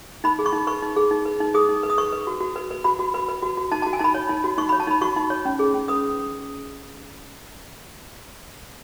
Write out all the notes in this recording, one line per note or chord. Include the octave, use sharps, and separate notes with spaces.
D#4 B5
G#4
C#6
D#4
B4 C#6
D#4
G#4
D#4
B4
D#4
G#4 D#6
D#4
B4
D#6
B4 C#6
B4
F#4
F#4
B4
B4
F#4 B5
F#4
B4
B4
F#4
F#4
D#4 A5
A5
F#4
G#5
D#4 A5 B5
C#5
D#4
F#4
D#4 C#6
B5
C#5
A5
D#4 B5
F#4 C#6
D#4
C#5
C#4
G#4
C#4
B4 D#6